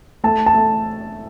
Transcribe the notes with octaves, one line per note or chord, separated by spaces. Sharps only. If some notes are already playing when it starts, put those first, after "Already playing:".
A3 A5
A5
A3